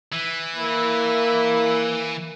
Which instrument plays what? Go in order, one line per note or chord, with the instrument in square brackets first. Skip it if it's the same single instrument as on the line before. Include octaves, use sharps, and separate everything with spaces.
[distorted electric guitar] E3
[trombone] A#3 [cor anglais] E4